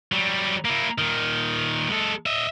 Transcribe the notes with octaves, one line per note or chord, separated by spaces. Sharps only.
F#3 G3
A#3 E4
A#2 D#3
G#3 A4
D#5 E5